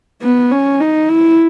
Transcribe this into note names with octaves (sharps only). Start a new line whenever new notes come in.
B3
C#4
D#4
E4